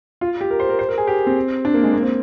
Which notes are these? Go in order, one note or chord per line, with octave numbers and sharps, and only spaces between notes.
F4
G4
A#4
C5
A#4
C5
A#4
G#4
G4
C4
D4
A#3
G#3
A#3
C4